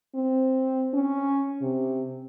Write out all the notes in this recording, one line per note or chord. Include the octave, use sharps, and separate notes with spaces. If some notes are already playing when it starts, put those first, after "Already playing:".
C4
C#4
C3